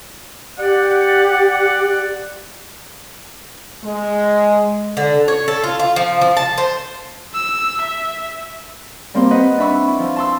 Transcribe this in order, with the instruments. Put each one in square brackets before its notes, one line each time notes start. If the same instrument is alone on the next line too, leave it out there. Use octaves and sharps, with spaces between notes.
[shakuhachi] G4 [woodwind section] D5 F#5
[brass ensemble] G#3
[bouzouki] D3
C#5
A4
F4
F4
F3
F3
A5
C5
[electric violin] E6
E5
[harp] G3 A#3 C4 G4 C5
B4 D#5 F#5
D4 E5 B5 C#6 E6
E4
F3
A5 C6 E6